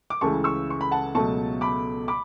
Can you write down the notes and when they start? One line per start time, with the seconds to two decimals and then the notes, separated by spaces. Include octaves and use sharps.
0.10 D6
0.21 C#2 C#3 E3 A3 A5 C#6
0.44 C#6 E6
0.70 C#6
0.81 B5
0.91 F#5 A5
1.15 C#2 B2 F#3 A3 A5 C#6
1.61 B5 D6
2.08 B5 D6